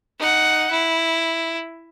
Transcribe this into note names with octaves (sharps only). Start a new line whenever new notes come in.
D#4 F#5
E4